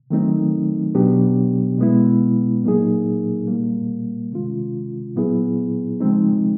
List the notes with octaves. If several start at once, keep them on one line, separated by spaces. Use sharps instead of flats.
D#3 F#3 A3 C4 D#4
B2 F#3 B3 D4 G4
B2 G#3 B3 E4
A#2 F#3 A#3 D#4 G#4
A#2 G3 A#3
C3 D#3 G#3 C#4 F4
A#2 F#3 B3 E4 G#4
C#3 F3 G#3 C4 D#4